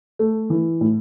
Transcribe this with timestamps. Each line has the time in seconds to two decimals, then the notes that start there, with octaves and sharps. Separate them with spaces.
0.19 A3
0.50 E3
0.81 A2